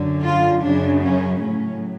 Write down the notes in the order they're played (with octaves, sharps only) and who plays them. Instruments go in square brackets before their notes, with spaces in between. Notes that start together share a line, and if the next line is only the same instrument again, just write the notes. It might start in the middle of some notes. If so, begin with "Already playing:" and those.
Already playing: [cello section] F#2 D3 F#3
F4
F#2 C#3 F#3 D4
C#4
A2 F#3 C#4